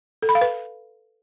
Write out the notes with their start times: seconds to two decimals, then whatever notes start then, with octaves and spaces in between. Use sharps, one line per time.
0.22 A4
0.29 B5
0.35 F5
0.41 B4